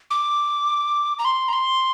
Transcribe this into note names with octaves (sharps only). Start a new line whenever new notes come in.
D6
A#5
C6
A#5
C6